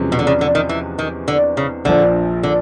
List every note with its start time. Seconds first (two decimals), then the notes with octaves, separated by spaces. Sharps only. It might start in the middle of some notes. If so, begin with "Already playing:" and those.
Already playing: E2 C3 F3 G#3 C#4
0.12 B2
0.19 D3
0.27 C#3
0.41 D3
0.55 D#3
0.69 E3
0.99 D#3
1.28 D3
1.57 C#3
1.85 A#1 A#2 D3 F3
2.43 D3